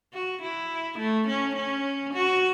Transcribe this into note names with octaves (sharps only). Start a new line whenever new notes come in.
F#4
E4
A3
C#4
C#4
F#4